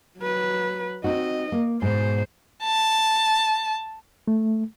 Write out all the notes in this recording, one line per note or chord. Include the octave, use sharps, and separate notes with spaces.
F#3 B4
C4 D#4 F#4 D#5
A#3
G#2 B2 C5
A5
A3